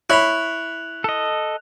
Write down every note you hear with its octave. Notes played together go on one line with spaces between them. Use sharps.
E4 C#5 B5 F#6 F7
A4 D#5